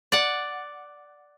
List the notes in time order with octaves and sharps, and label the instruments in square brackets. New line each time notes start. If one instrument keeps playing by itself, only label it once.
[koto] D5 F#5